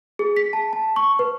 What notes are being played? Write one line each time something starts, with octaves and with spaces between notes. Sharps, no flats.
G#4
B6
A5
A5
C#6
B4